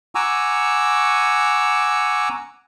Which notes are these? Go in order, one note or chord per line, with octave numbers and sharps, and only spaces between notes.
F#5 G#5 A#5 C#6 D6 E6